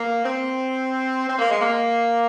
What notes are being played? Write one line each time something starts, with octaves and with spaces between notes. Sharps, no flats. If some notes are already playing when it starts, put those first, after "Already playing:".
Already playing: A#3
C4
C4
A#3
G#3
A#3